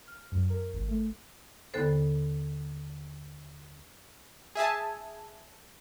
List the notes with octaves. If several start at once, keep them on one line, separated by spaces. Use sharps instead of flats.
F6
F#2
A#4
G#1
A3
D#2 D3 B3 A4 C5
G#4 E5 G#5 A5